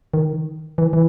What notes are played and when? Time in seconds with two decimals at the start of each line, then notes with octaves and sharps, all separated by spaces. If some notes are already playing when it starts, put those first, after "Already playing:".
0.14 D#3
0.78 E3
0.93 E3